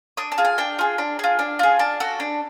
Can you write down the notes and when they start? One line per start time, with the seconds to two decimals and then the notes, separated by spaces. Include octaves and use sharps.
0.17 D4 D#6
0.32 A5
0.38 F4 G#4
0.45 G#5
0.58 D4 G5
0.79 F4 G#4
0.98 D4
1.19 F4 G#4
1.39 D4
1.59 F4 G#4
1.79 D4 A5
2.00 F#4 A4
2.20 D4